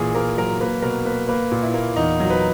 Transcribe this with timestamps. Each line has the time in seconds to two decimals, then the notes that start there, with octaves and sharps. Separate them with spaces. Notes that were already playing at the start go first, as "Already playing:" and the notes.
Already playing: A#2 E3 G#4
0.15 A#3 A#4
0.38 F#3 A#4
0.61 A#3 B4
0.82 B2 A#4
1.05 A#3 B4
1.28 A#3 B4
1.52 A#2
1.63 E4
1.74 A#3
1.96 E2 D#4
2.20 F#3
2.30 B4